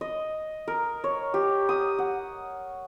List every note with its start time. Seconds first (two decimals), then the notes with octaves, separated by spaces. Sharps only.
0.01 D#5
0.68 A#4
1.04 C#5
1.34 G4
1.69 D#6
1.99 F#5